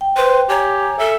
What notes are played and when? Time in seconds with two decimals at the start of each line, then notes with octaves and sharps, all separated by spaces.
0.01 G5
0.17 B4 C5
0.49 G4 C#5 G#5 A#5
0.99 A4 E5